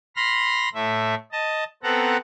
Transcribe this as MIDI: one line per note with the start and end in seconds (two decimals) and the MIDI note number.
0.16 0.69 83
0.16 0.69 84
0.16 0.69 89
0.16 0.69 94
0.75 1.15 45
0.75 1.15 57
0.75 1.15 76
1.32 1.64 75
1.32 1.64 81
1.83 2.17 59
1.83 2.17 60
1.83 2.17 69
1.83 2.17 78
1.83 2.17 82